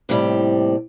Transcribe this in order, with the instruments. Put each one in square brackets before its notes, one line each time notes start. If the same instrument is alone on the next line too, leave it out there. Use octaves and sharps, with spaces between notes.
[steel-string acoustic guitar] D#2 A2 C3 G3 C4